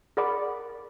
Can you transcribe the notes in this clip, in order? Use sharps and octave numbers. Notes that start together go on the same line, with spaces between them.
G#4 A#4 D5 F#5 B5 D6